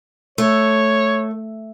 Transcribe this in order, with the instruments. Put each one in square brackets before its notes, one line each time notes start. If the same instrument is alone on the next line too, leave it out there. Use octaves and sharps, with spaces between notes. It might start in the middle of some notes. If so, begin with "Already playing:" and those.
[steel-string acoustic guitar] A3 [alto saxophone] C#5